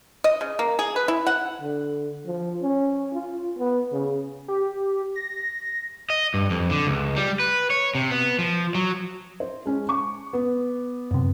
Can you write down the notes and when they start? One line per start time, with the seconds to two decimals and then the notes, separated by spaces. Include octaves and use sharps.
0.24 D#5
0.41 C#3
0.59 A#3
0.79 G#4
0.96 B4
1.08 E4
1.27 F#5
1.62 D3
2.26 F3
2.62 C#4
3.13 F4
3.59 B3
3.93 C#3
4.48 G4
5.16 A#6
6.10 D#5
6.34 G2
6.50 F2
6.71 D3
6.87 C#2
7.16 G3
7.40 B4
7.70 C#5
7.95 C3
8.11 B3
8.39 F3
8.75 F#3
9.40 C5
9.65 G#3 C#4
9.89 C#6 D6
10.33 B3
11.11 F#2 C3